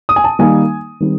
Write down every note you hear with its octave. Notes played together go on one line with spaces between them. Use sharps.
D#6
G#5
A5
D#3 G3 A#3 D#4 G#5
D#3 G3 C4